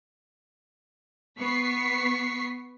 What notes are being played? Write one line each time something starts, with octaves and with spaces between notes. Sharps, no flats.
B3 C#6 B6 C7